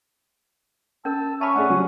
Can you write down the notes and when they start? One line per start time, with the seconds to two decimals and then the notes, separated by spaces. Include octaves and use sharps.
1.05 C#4 A#4 A5 E6
1.41 C#4 E5 A5 B5 C#6
1.55 A3 D4 G#4 F#5
1.68 C#3 F#3 G3